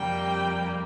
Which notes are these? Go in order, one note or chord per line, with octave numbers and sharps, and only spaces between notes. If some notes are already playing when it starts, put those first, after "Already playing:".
Already playing: F2 C3 G3 A#3 G5